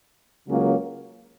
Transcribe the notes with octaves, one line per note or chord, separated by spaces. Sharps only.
C#2 C#3 F#3 A#3 C#4